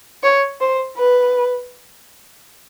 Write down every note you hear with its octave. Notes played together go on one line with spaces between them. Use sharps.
C#5
C5
B4